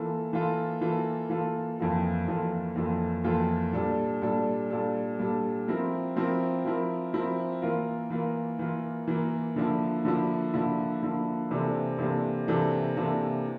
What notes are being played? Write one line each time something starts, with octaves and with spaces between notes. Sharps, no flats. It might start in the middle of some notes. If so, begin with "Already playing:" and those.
Already playing: E3 A#3 F4 A4
E3 A#3 F4 A4
E3 A#3 F4 A4
E3 A#3 F4 A4
F2 E3 A#3 F4 A4
F2 E3 A#3 F4 A4
F2 E3 A#3 F4 A4
F2 E3 A#3 F4 A4
A#2 G3 D4 A4
A#2 G3 D4 A4
A#2 G3 D4 A4
A#2 G3 D4 A4
F3 C4 E4 A#4
F3 C4 E4 A#4
F3 C4 E4 A#4
F3 C4 E4 A#4
E3 A#3 F4 A#4
E3 A#3 F4 A#4
E3 A#3 F4 A#4
E3 A#3 F4 A#4
D3 F3 A#3 E4
D3 F3 A#3 E4
D3 F3 A#3 E4
D3 F3 A#3 E4
C3 E3 A#3 D4 A4
C3 E3 A#3 D4 A4
C3 E3 A#3 D4 A4
C3 E3 A#3 D4 A4